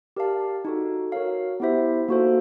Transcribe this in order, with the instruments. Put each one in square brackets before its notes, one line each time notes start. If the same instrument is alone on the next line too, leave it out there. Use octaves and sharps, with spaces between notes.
[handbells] G4 A#4 D5 F5 A5
D#4 F#4 A4
F#4 A#4 C#5 F5
B3 E4 G4 C5 E5
A#3 D#4 F#4 A4 C5